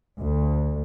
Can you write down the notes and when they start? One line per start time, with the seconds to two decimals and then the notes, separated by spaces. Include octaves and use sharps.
0.21 D2